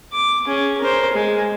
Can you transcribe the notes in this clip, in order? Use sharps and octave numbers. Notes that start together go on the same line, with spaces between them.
D6
C#4 G#4
A#4 C5
G#3